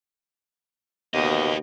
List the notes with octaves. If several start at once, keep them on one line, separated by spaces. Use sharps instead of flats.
D#2 B2 B3 G4 D#5